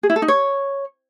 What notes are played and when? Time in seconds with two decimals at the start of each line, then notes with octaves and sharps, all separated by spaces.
0.03 G#4
0.10 E4
0.16 A4
0.22 D#4
0.28 C#5